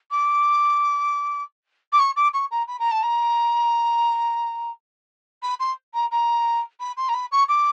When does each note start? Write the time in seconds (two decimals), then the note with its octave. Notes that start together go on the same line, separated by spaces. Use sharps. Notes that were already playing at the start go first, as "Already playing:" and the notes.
0.11 D6
1.92 D6
1.99 C#6
2.16 D6
2.33 C#6
2.51 A#5
2.67 B5
2.79 A#5
2.91 A5
3.03 A#5
5.42 B5
5.59 C6
5.94 A#5
6.11 A#5
6.80 B5
6.97 C6
7.09 A#5
7.14 B5
7.31 C#6
7.48 D6